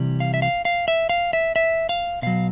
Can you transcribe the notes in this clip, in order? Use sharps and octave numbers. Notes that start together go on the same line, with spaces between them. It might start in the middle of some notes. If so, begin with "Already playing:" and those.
Already playing: C3 E3 G3
F5
E5
F5
F5
E5
F5
E5
E5
F5
B2 F#3 F5